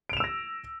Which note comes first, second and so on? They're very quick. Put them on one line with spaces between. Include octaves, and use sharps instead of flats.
D7 F7 E7 E6 A#6